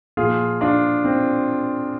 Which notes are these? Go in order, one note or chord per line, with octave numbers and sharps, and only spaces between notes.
A#2 F3 F4 G#4
D4 F4
C4